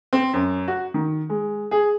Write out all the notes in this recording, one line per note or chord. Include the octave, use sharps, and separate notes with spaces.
C4
F#2
F#4
D#3
G#3
G#4